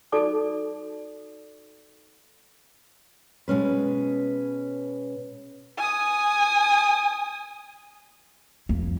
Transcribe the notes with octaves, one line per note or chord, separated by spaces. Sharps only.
D#4 F#4 A4 D5 A5 D6
B2 G#3 C#4 B4
G#5 D#6
F2